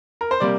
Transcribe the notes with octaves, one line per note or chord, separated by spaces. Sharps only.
A#4
C5
C3 G3 A#3 D5